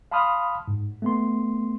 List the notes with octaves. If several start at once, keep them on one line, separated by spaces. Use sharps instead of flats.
F5 A5 B5 C6 D#6 F6
G#2
A3 B3 C6